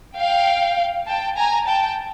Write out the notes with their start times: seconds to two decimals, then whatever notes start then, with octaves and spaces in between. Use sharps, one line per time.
0.18 F5 G5
1.07 G5 A5
1.37 G#5 A#5
1.66 G5 A5